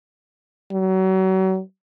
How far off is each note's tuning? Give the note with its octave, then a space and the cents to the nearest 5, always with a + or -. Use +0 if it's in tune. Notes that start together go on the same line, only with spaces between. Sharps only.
F#3 +35